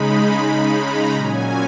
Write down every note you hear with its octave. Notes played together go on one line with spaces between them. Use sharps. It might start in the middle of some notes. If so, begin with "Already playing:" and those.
Already playing: C#3 G#3 D#4 B5
C#3 G#3 D#4
A#5
A#2 F#3 C#4 G#5